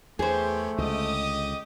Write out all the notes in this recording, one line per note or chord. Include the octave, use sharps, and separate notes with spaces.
E2 A3 B3 G4 G#4 C5 C#5
C#2 D3 G4 D#5 D#6